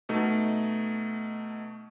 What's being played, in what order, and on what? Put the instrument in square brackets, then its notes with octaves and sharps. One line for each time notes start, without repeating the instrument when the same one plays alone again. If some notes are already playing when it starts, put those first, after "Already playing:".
[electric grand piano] B2 A3 D#4